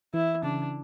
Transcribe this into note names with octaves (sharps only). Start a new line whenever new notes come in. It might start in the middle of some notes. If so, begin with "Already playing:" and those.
E3 E4
C#3 D4